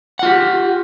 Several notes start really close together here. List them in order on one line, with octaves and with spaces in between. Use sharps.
F#5 F4 G4